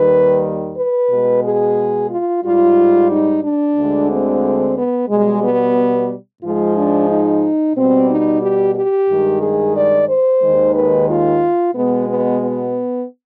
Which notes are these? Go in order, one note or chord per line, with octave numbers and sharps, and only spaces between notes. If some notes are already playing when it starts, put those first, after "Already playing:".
Already playing: D#2 D#3 G3 B4
B4
B2 G#3
G#4
F4
G#2 G3 F4
D#4
D4
D2 D3 G#3
C4
B3
B2 G3 G#3
B3
G#2 F3 G#3 F4
D4
D#4
B2 G3 C4
D#4
G4
G4
G2 D#3 G#3
G#4
D5
C5
D#2 D#3 G#3
B4
F4
B2 G#3 B3
B3
B3